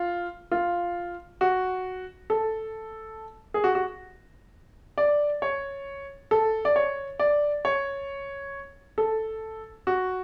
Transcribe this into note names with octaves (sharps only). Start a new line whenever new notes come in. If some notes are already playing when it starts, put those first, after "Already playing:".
Already playing: F4
F4
F#4
A4
G#4
F#4
F#4
D5
C#5
A4
D5
C#5
D5
C#5
A4
F#4